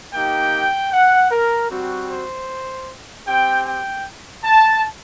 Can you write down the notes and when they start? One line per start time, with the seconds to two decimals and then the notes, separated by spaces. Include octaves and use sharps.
0.14 A#3 D#4 G4 G5
0.92 F#5
1.31 A#4
1.70 G3 C4 F#4
2.09 C5
3.27 C4 G4 G5
3.66 G5
4.44 A5